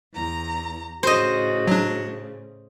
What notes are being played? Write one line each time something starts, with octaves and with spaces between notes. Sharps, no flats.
E2 A#5
A2 C#3 F#4 C5 D#5
F#3 D4